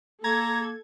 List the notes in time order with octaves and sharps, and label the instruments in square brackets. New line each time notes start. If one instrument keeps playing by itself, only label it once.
[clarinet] A#3 [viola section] A4 [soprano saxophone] A#5 [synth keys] G#6